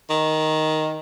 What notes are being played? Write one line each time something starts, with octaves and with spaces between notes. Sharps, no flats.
D#3